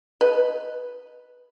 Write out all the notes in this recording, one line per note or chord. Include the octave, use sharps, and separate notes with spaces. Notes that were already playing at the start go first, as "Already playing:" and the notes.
B4 D#5